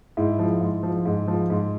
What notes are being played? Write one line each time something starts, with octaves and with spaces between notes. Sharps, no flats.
G#2 E4
F3
G#2
F3
G#2
F3
G#2